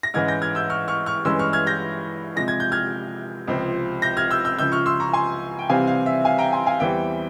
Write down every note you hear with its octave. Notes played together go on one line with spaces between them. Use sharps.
A#6
G#2 E3 G#3 C#4 F6 G#6
G6 A#6
F6 G#6
E6 G6
C#6 F6
C#6 F6
C#6 F6
G2 E3 G#3 C#4 C6 E6
C#6 F6
F6 G#6
G6 A#6
C3 F3 G#3 A#6
G#6
G6
F6 G#6
C#2 C3 F3 C4
G6 A#6
F6 G#6
E6 G6
E6 G6
C#2 C#3 F3 E6 G6
C#6 F6
C6 E6
A#5 C#6
G#5 C6
G5
C2 C3 E3 G3 C4 F5 G#5
F5
E5
F5 G#5
G5 A#5
G#5 C6
F5 G#5
E2 E3 G3 C4 E5 G5